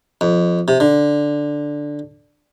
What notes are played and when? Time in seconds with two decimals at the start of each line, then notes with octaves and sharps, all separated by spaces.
0.21 F2
0.68 C3
0.80 D3